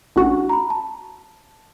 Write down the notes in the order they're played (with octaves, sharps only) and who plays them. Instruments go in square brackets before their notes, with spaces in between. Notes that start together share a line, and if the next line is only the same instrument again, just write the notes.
[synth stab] A1 F#4 [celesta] D4
[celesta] A#5 B5
A5